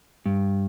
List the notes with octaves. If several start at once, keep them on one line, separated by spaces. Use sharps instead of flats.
G2